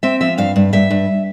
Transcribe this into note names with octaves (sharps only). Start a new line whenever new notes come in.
C4 E5
F3 E5
G2 F5
G2
G2 E5
G2